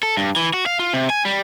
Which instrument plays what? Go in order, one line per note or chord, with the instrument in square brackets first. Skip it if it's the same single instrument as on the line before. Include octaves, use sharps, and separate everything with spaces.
[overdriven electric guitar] A4
G2
E3
F#4
F5
F4
C3
G#5
G3